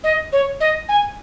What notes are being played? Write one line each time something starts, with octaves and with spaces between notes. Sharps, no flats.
D#5
C#5
D#5
G#5